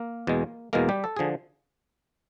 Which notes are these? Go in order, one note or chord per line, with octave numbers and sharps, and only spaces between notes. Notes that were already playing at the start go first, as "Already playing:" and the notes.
Already playing: A#3 A#4
E2 B2 G#3
E2 B2 G#3 A#3 A#4
G3 G4
A4
D3 F3 G#4